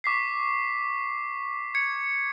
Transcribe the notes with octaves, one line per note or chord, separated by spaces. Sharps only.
C#6 D6 B6 C7
G#6 C#7